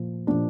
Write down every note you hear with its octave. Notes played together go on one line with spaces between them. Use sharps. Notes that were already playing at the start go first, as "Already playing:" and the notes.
Already playing: A#2 F3
A#2 F3 D4